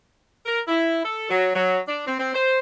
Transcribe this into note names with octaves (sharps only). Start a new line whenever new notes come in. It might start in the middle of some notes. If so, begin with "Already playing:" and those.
A#4
E4
A4
F#3
F#3
D4
C4
C4
C5